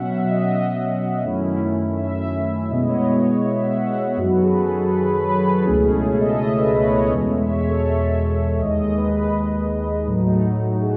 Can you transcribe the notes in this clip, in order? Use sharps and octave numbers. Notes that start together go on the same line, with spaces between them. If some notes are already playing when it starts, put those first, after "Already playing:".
Already playing: B2 F#3 C#4 E5 F#5
E5
D#5
F#2 D#3 A3 C#4 E4
E5
B2 G#3 B3 E4 D#5
C#5
C#5
E5
F#5
E5
C#5
F#2 D#3 F#3 F#4
B4
A4
G#4
A4
B4
C#5
B4
A4
C#2 B2 A3 C#4 E4 G#4
G#4
A4
E5
D#5
E5
B4
C#5
D#5
E2 B2 G#3
E5
C#5
A4
E5
E5
D#2 D#3 G#3 D#5
B4
A2 F#3 A3 D#4
F#4
G#4